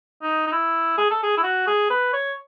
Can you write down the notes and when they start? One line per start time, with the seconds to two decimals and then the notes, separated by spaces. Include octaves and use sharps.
0.22 D#4
0.47 D#4
0.52 E4
0.98 G#4
1.11 A4
1.23 G#4
1.37 E4
1.43 F#4
1.67 G#4
1.90 B4
2.13 C#5